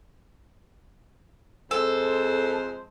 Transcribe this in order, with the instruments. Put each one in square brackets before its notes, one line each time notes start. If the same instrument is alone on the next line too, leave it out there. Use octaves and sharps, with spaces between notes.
[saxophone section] F2 G#3 C5 [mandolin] A4